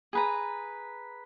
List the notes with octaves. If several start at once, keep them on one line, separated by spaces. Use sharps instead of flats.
G#4 B4 A#5